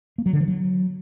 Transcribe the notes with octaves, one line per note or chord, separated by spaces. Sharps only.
A#3
F#3
D3
F3
F#3